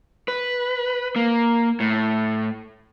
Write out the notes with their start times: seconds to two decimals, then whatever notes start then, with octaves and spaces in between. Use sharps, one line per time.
0.28 B4
1.16 A#3
1.80 A2